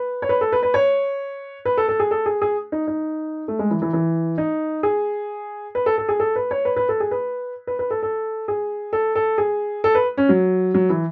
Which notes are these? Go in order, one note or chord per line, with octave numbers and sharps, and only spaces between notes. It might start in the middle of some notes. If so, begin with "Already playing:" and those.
Already playing: B4
C#5
B4
A4
B4
B4
C#5
B4
A4
A4
G#4
A4
G#4
G#4
D#4
D#4
A3
G#3
E3
E3
E3
D#4
G#4
B4
A4
A4
G#4
A4
B4
C#5
B4
B4
A4
G#4
B4
B4
B4
A4
A4
G#4
A4
A4
G#4
A4
B4
C#4
F#3
F#3
E3